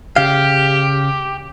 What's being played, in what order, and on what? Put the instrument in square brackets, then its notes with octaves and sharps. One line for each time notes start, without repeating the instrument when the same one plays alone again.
[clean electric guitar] C#3 F5 [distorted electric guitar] G4